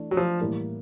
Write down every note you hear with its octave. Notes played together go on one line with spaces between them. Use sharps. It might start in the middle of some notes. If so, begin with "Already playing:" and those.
Already playing: E3 A3 D4
F#3
F3
A2 E3 G3 A#3